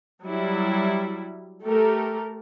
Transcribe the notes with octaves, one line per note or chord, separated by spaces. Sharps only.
F#3 G3 E4
A3 G4 A4 A#4